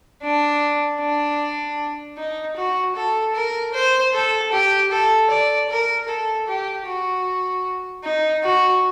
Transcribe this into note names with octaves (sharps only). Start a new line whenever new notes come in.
D4
D4
D#4
F#4
A4
A#4
C5
A4
G4
A4
D5
A#4
A4
G4
F#4
D#4
F#4